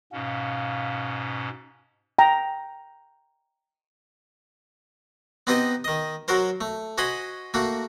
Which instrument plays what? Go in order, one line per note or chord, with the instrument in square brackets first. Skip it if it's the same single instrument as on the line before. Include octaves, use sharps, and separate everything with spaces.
[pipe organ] G#2 B2 C#4 [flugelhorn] F5
[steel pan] G5 A#5
[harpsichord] B3 C4 D#4 G4 B4 D#5
D#3 D#5
F#3 F#4 A#4 C5
A3
F#4 C5 D#5 G#5 B5
A3 A#3 F#4